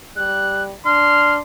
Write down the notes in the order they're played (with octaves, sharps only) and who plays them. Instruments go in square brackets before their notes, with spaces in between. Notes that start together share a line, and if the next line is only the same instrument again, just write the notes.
[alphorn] G3 [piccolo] F#6
[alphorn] D4 [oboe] C6 [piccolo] F6